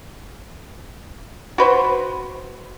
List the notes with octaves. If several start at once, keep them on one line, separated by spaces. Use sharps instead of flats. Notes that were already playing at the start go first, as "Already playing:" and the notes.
F#4 B4 C5